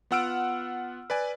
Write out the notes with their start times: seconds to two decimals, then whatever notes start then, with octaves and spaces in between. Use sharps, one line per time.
0.11 B3 F4 F#5 E6 F6 D7
1.10 B4 D5 G#5